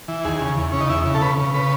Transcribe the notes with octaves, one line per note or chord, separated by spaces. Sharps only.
E3
D#2 G#4
C#3
E2
C#3 C#4
D#4
E2 E4
C#3
A4
C#3 B4
C#3
C#3 B4